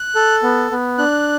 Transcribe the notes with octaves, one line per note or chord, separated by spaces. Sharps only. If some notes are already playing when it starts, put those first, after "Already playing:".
Already playing: F#6
A4
B3
B3
D4 F#6